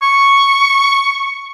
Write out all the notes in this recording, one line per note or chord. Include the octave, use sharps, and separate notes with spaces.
C#6